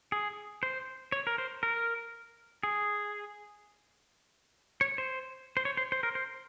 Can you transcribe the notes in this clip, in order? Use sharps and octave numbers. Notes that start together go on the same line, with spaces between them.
G#4
C5
C#5
A#4
C5
A#4
G#4
C#5
C5
C5
C#5
C5
C5
A#4
C5